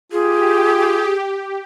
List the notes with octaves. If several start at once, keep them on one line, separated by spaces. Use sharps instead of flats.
F4 G4 G#4